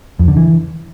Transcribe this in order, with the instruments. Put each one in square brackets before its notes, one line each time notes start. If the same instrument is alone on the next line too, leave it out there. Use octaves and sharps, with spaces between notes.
[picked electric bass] F2
D3
E3